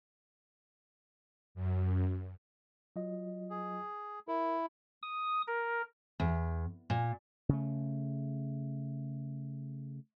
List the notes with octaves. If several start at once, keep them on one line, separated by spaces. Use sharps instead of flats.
F#2
F#3 F4 D#5
G#4
E4 A#4
D#6
A#4
E2
A#2
C#3 A3